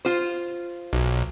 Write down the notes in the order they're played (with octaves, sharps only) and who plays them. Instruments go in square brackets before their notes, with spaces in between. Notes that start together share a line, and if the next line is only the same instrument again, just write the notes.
[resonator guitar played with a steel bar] F4 C5
[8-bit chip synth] B1